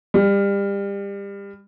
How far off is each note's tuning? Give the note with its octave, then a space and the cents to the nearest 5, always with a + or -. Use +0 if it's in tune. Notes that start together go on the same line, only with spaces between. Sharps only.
G3 +30